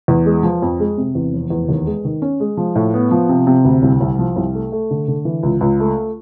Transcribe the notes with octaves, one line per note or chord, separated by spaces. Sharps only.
E2
G#3
F3
F2
G#3
C3
E2
F1
E2
D#2
G#3
D#3
C#4
G#3
F3
A2
B3
F3
C3
C3
D2
C2
C2
F3
C2
A3
A3
D3
D3
E3
C#2
C#2
A3